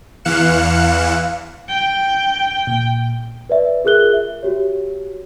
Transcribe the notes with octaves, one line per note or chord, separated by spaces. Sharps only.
E2 E3 F5 F#6 C#7 E7
G5
A#2
B4 D5 E5
F4 G#4 A#4 F#6 G7
E5
F#4 G4 C#5